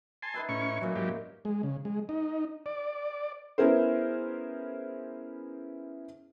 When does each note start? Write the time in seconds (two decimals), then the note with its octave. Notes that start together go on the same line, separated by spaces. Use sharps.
0.23 G#5 A5 C6
0.34 D#4 B4 E5
0.49 A2 C#4 C#6
0.81 A#2 F#3 C#4
0.96 G#2 F#3 G4
1.45 G#3
1.63 C#3
1.85 G#3
2.09 D#4
2.66 D5
3.58 B3 C#4 E4 G#4 A#4 C5